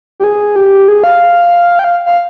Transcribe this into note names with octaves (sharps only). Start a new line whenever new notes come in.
G4
G#4
G4
G#4
F5
G5
F5
F5